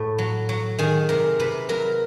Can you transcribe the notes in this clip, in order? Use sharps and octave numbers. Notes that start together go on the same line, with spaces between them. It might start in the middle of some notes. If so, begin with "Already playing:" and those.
Already playing: A2
F#3
F#3
D#3 G#4
C3 A#4
C3 B4
F#3 A#4